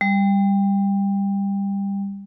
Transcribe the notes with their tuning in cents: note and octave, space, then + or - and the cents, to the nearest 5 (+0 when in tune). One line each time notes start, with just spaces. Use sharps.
G3 +20